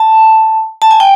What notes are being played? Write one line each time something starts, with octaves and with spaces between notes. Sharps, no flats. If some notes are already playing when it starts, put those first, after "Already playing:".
Already playing: A5
A5
G#5
G5